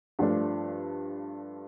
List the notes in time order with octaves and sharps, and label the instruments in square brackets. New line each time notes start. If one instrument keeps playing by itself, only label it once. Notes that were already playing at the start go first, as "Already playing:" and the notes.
[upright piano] G2 F3 A3 D4